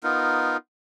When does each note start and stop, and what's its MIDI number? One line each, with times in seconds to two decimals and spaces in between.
0.03 0.57 59
0.03 0.57 63
0.03 0.57 65
0.03 0.57 70